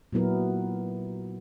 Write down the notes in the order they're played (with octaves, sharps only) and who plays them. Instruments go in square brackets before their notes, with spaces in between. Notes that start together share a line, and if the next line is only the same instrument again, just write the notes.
[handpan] A#2 F#3 B3 E4 A#4